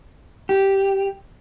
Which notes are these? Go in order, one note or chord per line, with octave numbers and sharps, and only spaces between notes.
G4